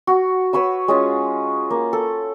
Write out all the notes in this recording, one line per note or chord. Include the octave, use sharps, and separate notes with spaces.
F#4
B4 C#5 B5 E6
G#3 C#4 F4
A#3
A4